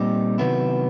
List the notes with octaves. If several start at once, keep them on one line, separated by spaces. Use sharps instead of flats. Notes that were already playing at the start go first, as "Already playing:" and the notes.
Already playing: A#2 G3 C4 D#4 G4
C3 D#3 F#3 B3 E4